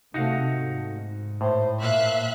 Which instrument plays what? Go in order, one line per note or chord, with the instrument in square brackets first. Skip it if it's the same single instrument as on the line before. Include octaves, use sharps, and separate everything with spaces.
[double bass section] C3 A3 [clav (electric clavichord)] D#4 F#4 F5
[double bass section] G#2
[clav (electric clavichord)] A2 [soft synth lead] C5
[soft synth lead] A#2 [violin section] E5 F5 F#6